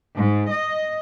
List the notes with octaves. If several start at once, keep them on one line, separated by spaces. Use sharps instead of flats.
G#2
D#5